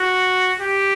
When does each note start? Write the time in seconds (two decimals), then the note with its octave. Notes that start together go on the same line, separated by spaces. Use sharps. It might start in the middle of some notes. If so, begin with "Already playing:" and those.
Already playing: F#4
0.60 G4